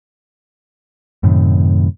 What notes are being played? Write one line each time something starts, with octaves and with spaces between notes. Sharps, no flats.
F#2 A2 C3 D#3